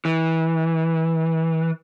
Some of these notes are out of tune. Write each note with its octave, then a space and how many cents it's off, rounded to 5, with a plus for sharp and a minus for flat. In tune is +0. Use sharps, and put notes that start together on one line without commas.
E3 -20